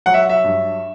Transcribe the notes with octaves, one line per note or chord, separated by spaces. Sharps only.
F#3 F#5
E5
E5
G2